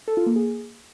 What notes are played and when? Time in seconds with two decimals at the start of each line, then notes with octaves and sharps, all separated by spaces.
0.08 A4
0.17 F4
0.26 A#3
0.36 G#4